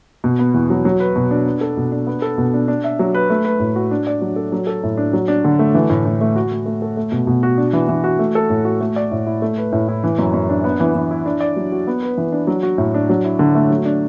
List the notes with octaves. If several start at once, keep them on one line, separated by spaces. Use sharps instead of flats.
B2
B3
E2
F#3
F#3
B4
B2
D4
B3
A4
B2
D4
B3
A4
B2
D4
D4
E5
F#3
B4
A3
B4
A2
F#4
D4
D5
F#3
A4
F#3
A4
A2
D4
F#3
D4
D3
A3
E3
A2
A2
A3
F#4
A3
A3
A4
A3
B2
B2
F#4
D4
E3
E3
F#4
A3
A4
A2
F#4
A3
D5
A2
E4
A3
B4
A2
E4
E3
F#2
F#2
D4
B3
E3
E3
E4
D4
D5
F#3
F#4
B3
B4
E3
D4
F#3
F#4
A2
D4
F#3
E4
D3
A3
F#3
D4